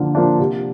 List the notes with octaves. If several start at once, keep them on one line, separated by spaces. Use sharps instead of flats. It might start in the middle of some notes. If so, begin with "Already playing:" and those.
Already playing: D3 F3 A#3 D4
F3 A#3 D4
C3